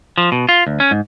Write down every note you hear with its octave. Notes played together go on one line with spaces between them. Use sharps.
F3
B2
F4
D2
C#4
G#2